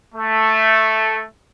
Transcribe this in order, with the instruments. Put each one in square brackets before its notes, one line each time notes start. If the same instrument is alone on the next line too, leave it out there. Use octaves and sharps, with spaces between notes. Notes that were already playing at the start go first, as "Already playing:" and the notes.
[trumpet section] A3